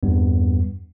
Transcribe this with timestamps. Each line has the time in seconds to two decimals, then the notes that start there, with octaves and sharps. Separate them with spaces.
0.03 E2 G2 G3 B3